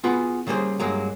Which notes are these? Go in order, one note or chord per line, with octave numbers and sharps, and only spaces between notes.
B3 F4 F#4 G#4 B4 B5
C#3 G3 A#3 G#4 C5
G2 F#3 G#3 A#3